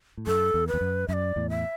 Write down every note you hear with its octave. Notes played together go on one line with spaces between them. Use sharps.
A2
F#2 A4
E2
B4
E2
F#2
F#2 D5 E5
E2 A2
E5